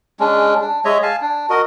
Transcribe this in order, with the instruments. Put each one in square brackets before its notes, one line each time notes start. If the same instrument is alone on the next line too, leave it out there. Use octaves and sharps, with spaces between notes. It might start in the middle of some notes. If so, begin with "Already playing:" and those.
[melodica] G#3 C#4 D4
D4
G#3 C#5 D#5 E5
F5 G#5 A5
D4
F#4 A#4 D#5